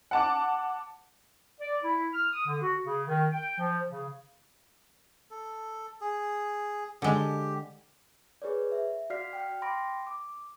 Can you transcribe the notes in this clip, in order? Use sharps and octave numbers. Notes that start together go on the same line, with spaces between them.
F#5 A5 D6
D5
E4
F6
D#6
D3
F#4
C#3
D#3
G5
F3
C#3
A4
G#4
D3 G#3 G4
G#4 B4 C#5 D5
E5
F#4 D5 F5 F6 B6 C7
G5 F6
G5 B5 C6 D6 A#6 D7
D6